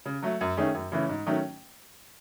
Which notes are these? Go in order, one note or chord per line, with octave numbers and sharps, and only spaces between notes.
C#3
F#3 A3
F#2
D#3 A3 C#4 G#4
F#2
C#3 E3 A3 C#4
G#2
D#3 F#3 A3 C#4